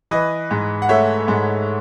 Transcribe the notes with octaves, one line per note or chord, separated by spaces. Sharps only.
E3 B4 D#5
G#2
F#5
A3 C#5 E5
G#2